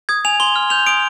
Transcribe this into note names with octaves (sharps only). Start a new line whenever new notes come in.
D#6 G#6
G#5 F7
C6 G7
F6
G6 F7
D#6 D7